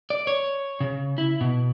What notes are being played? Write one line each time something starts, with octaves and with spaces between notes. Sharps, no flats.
D5
C#5
C#3
E4
B2